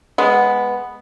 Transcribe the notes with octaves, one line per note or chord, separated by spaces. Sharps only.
G#3 B3